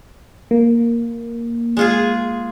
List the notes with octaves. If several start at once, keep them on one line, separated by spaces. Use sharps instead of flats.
A#3
G#3 F4 G#4